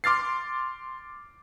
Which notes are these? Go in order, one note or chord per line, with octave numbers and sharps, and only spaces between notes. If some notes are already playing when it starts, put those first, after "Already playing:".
C6 D6 F6 A6 C7